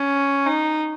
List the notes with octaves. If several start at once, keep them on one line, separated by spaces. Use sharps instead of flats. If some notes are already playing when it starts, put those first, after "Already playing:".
Already playing: C#4
D#4